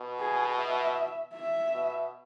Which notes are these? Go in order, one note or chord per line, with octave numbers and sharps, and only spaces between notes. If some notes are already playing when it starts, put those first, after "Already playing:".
Already playing: B2
G#4
E5
E5
B2